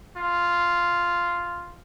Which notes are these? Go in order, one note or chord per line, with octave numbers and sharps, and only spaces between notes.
F4